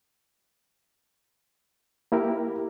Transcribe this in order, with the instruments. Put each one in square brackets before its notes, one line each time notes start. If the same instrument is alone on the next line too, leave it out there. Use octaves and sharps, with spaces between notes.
[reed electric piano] A#3 E4 G4 A#4